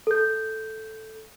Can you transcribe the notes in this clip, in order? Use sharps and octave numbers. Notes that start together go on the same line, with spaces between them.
A4 G6